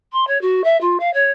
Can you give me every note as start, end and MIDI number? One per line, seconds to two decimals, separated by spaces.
0.12 0.25 84
0.27 0.40 73
0.41 0.62 66
0.64 0.79 76
0.81 0.97 65
0.99 1.12 77
1.13 1.30 73